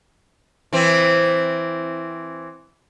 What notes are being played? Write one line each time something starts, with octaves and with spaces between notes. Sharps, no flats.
E3 C4